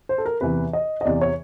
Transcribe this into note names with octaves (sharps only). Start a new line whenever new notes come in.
C5
A4
A#4
E2 C3 E3 B4
D#5
D#5
E2 C3 E3 D5
C#5